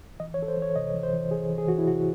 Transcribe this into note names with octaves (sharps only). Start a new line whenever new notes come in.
E3 D#5
C#5
E3 A4
C5
E3 C#5
C3 D#5
E3
C5
E3
E3 G#4
E3
G#4
E3 F#4
E4
C3 F#4